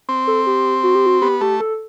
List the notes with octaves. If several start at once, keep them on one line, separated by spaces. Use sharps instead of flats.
C4
A4
G4
F#4
G4
F#4
B3 G4
A3 G4
A4